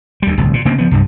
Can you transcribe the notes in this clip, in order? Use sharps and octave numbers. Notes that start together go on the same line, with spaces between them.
D2 G3
D1 C2
A#2
C#3 A#3 C4
F3 B3
C2 G2